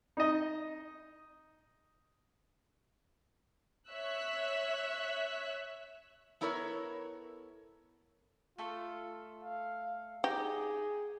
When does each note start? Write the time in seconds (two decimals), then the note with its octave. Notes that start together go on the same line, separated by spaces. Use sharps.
0.17 D#4 D#5
3.89 C#5 E5 E6 F#6
6.41 B3 E4 A4 A#4 C#5
8.58 A3 F4 A4
9.43 F5
10.24 D#4 G4 G#4